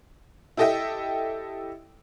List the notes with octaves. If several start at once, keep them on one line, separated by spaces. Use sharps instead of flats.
E4 G4 A4 D#5 E5 G5